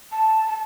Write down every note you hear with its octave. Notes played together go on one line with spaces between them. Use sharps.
A5
A5